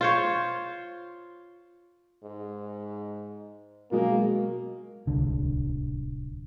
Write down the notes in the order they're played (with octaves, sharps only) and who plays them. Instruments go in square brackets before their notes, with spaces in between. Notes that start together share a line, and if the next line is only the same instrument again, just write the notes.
[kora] F4 C5 C#5
[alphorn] G#2
[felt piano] B2 F#3 G#3 [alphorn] A#3
[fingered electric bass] D1 C2 D3